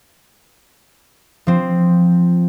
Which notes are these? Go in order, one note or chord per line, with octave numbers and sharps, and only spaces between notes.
F3 C4